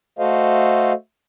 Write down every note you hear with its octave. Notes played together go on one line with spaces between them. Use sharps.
A3 F#4 A4 C5 D#5 F5